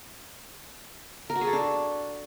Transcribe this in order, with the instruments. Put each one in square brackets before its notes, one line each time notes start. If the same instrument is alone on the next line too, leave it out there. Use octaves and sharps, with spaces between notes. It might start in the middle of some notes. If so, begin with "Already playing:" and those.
[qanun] A#4
F#4
G#4
A4
D4